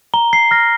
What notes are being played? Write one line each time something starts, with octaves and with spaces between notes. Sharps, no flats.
A#5 G7
C7
F6 A#6